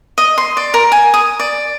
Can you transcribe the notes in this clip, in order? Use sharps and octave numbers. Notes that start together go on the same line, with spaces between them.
D#5
C6
D5
A#4
G#5
D#6
D5